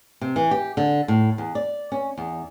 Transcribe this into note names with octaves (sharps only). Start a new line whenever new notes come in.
C3
E3
G4
D3
A2
E2
D5
C#4
E2